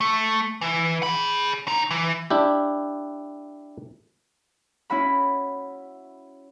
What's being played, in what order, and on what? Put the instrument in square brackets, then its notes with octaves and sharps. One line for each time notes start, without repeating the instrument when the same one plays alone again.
[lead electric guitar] A3
E3
G#4 B5
C#3 D#4
E3
[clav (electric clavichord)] D4 E4 G4
[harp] C#4 E4 F#4 F#5 B5